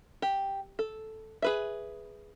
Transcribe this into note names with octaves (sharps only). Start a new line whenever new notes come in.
G4
A4
G#4 B4 E5